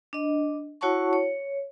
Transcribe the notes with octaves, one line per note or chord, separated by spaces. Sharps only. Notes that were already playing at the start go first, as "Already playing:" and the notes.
D4 D#5
E4 F#4 C#5 F#5 A5 C#6
C#5